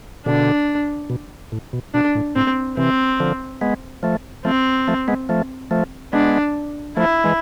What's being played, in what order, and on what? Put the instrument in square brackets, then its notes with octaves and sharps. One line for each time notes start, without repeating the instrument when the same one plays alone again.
[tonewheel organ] B2 D3 [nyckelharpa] D4
[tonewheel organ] B2
A2
B2
[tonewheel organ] B2 [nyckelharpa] D4
[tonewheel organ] A2
[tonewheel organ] A2 [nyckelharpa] C4
[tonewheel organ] C3 E3 [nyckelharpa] C4
[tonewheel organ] D3 F3
G#3 B3
F3 A3
[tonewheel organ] F3 A3 [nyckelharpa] C4
[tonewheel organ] F3 A3
G#3 B3
F3 A3
F3 A3
[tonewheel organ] G#3 B3 [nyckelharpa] D4
[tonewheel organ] F3 A3 [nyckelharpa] E4
[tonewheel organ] E3 G#3